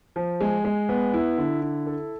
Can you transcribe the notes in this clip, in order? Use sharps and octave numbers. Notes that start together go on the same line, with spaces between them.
F3
G#3
G#3
B3
E4
D3
E4
A4